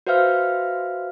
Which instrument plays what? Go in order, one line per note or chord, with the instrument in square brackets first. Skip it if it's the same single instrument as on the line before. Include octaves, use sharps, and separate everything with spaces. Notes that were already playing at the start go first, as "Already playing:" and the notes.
[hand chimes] F#4 B4 C5 E5 F5 F6